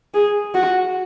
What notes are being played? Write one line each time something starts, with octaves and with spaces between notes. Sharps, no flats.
G#4
F#4